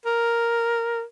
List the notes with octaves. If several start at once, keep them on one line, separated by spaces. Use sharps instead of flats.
A#4